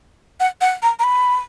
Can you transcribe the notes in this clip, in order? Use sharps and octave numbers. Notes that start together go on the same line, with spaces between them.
F#5
F#5
A#5
A#5
B5